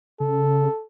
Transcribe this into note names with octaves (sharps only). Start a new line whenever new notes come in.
C#3 A4